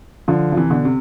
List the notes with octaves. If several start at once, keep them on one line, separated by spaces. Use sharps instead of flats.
D3 F3
F3
C3 E3
B2 D3
C3